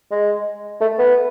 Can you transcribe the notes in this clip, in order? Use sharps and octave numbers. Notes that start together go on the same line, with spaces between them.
G#3
A3
B3